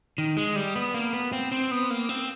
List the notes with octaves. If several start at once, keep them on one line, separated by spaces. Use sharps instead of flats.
D#3
G#3
G3
B3
A#3
B3
C4
C4
B3
A#3
C4